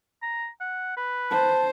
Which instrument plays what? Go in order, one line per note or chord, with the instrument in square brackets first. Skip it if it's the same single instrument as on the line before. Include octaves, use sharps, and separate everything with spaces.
[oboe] A#5
F#5
B4
[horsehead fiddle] C5 [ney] A5